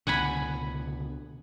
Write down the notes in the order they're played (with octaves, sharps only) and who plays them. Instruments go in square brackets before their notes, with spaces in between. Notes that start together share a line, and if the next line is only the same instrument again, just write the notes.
[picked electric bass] C#2 B2 D3 [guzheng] F#5 G#5 B5